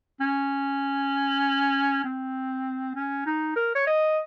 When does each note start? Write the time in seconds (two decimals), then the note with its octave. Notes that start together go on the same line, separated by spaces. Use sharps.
0.21 C#4
2.04 C4
2.95 C#4
3.26 D#4
3.56 A#4
3.75 C#5
3.87 D#5